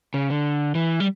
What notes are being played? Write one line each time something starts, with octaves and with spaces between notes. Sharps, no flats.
C#3
D3
E3
G3